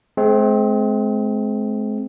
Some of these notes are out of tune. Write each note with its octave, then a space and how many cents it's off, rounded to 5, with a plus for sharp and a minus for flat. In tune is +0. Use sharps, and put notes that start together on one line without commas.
G#3 +40 C4 +0